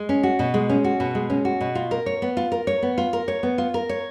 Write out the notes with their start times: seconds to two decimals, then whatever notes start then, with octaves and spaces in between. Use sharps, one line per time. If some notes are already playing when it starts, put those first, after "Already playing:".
Already playing: G#3
0.09 C#4
0.23 F#4
0.39 B2
0.54 G#3
0.70 C#4
0.84 F#4
1.00 B2
1.15 G#3
1.30 C#4
1.45 F#4
1.61 B2
1.75 F4
1.91 A#4
2.06 C#5
2.22 B3
2.37 F4
2.52 A#4
2.67 C#5
2.82 B3
2.98 F4
3.13 A#4
3.28 C#5
3.43 B3
3.58 F4
3.74 A#4
3.89 C#5